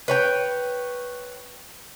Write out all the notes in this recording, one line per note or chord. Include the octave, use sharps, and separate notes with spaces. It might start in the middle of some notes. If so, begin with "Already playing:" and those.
B4 C#5 G5